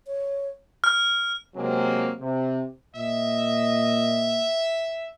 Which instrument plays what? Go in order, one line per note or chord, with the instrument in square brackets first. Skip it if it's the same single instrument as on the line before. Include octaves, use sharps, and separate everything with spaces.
[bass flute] C#5
[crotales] F6
[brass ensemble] C3 F#3 G#3 A#3 C4
C3
[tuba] A#2 [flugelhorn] D#5 [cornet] E5